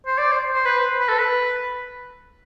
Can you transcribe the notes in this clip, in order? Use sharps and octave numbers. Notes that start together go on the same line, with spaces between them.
C5
D5
C5
C5
B4
C5
B4
A4
B4